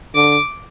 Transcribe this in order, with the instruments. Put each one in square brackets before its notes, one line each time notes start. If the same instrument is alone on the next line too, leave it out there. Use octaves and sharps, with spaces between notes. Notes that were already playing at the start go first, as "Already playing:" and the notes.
[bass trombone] D3 [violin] D6